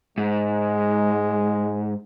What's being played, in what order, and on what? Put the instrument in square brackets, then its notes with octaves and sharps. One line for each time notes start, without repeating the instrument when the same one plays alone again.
[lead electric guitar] G#2 [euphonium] G#3